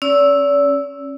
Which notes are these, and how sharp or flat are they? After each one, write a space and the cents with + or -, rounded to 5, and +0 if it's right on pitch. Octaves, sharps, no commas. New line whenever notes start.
C#4 -25 D5 -40 E6 +0